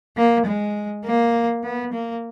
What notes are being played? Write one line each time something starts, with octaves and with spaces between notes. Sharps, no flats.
A#3
G#3
A#3
B3
A#3